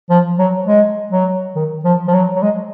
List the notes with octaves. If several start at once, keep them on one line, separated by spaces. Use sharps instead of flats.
F3
F#3
G#3
F#3
D#3
F3
F3
F#3
F#3
G#3